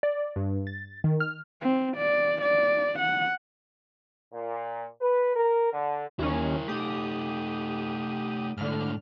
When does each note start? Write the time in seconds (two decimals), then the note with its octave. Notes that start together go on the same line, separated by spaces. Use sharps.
0.03 D5
0.36 G2
0.67 A6
1.04 D#3
1.20 F6
1.61 C4
1.97 D5
2.42 D5
2.99 F#5
4.34 A#2
5.01 B4
5.36 A#4
5.73 D3
6.19 D#2 C#4 E4 A#4
6.68 A3 D#4 G4 D#6
8.57 G#2 D3 A3 F6